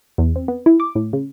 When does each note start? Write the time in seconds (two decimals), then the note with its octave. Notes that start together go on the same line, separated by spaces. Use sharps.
0.18 E2
0.36 C4
0.48 B3
0.66 E4
0.80 D6
0.95 A2
1.13 C#3